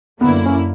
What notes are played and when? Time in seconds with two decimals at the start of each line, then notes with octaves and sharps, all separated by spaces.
0.21 F#2 D3 A#3 B3 E4
0.46 C#4